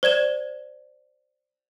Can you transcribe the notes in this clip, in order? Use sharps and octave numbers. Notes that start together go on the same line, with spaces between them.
C5 D5 G#6 E7